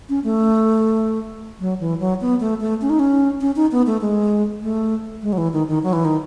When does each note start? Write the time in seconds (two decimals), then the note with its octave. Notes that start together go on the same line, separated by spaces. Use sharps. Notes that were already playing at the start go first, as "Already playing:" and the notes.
0.09 C#4
0.24 A3
1.60 F#3
1.80 E3
2.00 F#3
2.21 B3
2.40 A3
2.61 A3
2.81 C#4
2.90 D#4
2.99 C#4
3.41 C#4
3.56 D#4
3.72 B3
3.86 A3
4.01 G#3
4.62 A3
5.22 G#3
5.33 F#3
5.38 E3
5.53 D#3
5.68 D#3
5.83 F#3
5.93 E3
6.05 D#3